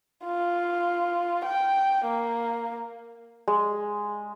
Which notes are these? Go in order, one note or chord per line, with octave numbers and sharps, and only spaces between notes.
F4
G5
A#3
G#3